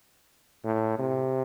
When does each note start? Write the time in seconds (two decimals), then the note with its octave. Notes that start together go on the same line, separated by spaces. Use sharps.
0.65 A2
0.99 C3